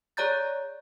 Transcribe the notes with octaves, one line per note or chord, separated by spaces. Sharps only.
G#4 C#5 D5 A#5 G6 A6